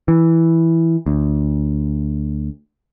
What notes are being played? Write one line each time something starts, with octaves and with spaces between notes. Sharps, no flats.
E3
D2